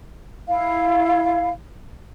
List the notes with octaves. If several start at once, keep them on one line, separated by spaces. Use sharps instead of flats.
E4 F5